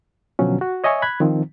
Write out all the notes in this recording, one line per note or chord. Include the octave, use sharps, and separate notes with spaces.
B2 D3 F3 F#3 C#4
F#4
C#5 D#5 E5 G#5 C#6
B5 F#6 G#6
D#3 F3 C4